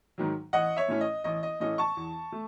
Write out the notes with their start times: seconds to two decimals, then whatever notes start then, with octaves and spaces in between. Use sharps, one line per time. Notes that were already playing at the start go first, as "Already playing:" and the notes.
0.18 G#2 D#3 F#3
0.53 A1 D#5 F#5
0.76 C#5 E5
0.88 A2 E3 A3 C#4
1.01 D#5
1.24 A1 D#5
1.43 D#5
1.60 A2 E3 A3 C#4 D#5
1.78 A5 C#6
1.97 E2
2.32 A3